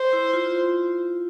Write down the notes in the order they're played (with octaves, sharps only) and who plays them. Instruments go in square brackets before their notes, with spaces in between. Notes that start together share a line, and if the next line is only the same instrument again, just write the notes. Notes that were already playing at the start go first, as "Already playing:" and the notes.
Already playing: [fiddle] C5
[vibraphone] E4
F4